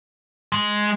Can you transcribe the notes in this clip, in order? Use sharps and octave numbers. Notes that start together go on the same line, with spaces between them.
G#3